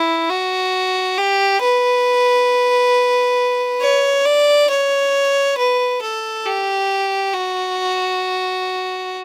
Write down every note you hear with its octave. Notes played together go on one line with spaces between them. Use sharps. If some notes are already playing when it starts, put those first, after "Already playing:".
Already playing: E4
F#4
G4
B4
C#5
D5
C#5
B4
A4
G4
F#4